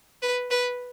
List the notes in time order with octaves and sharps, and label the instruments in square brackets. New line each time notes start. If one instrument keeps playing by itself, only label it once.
[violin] B4
B4